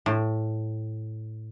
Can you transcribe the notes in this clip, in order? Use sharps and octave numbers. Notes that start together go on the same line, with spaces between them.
A2